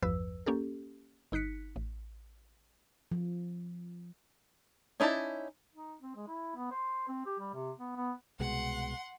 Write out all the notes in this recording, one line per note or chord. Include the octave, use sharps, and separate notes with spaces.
A1 E2 G2 F3 B4 E6
A#3 C#4 G4 A4
G1 D#4 F#6 B6 C#7
A1
F3
C#4 D#4 E4 D5 A5
D#4
C4
G#3
E4
B3
C5
C4
G4
G3
C3
B3
B3
C2 B2 G#3 F#5 C6